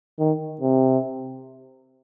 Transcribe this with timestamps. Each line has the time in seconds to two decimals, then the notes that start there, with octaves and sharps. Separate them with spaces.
0.19 D#3
0.61 C3